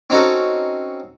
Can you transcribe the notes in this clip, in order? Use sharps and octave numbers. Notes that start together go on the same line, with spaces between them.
C4 C#4 D#4 F#4 A4